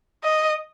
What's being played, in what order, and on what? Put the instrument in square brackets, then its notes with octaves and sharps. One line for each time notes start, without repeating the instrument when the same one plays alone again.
[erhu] D#5